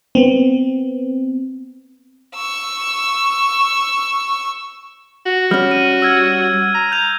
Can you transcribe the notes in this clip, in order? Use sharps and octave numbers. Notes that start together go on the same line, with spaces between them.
B3 C4
C#6 E6
F#4
G3 C#4 F6
D#7
E6 F6 G#6
A#5
G6 F7